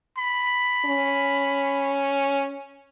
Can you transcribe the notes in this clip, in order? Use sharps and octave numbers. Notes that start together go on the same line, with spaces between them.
B5
C#4